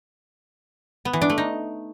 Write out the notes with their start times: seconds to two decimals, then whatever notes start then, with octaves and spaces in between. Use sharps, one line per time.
1.05 B3
1.13 E3
1.22 D4
1.30 A3
1.38 D#4